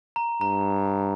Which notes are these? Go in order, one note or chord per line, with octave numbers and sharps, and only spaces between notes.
A#5
G2 A#5